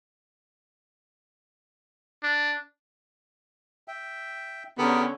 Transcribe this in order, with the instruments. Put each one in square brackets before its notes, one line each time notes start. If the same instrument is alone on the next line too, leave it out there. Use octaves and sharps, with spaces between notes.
[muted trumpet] D4
[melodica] E5 G5
[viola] D3 C#4 [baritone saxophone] B3 [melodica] G4 G#4 A#4